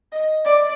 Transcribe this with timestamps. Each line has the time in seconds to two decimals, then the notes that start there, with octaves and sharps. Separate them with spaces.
0.12 D#5
0.45 D5